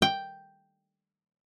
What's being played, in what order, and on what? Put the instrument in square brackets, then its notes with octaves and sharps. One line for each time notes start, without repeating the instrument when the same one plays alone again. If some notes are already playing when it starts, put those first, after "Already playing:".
[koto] G5